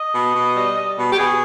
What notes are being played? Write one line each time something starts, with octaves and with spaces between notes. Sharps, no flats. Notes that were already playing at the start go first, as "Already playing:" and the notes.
Already playing: D#5
B2
B2
G3
G3
B2
G4
B2 G#4